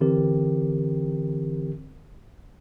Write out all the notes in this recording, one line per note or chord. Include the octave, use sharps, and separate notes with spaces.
D3 E3 C4 G4 A#4